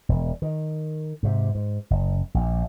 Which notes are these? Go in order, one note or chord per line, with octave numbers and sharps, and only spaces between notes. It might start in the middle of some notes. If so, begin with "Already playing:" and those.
E1
D#3
G#2 C3
G#2
F#1
A#1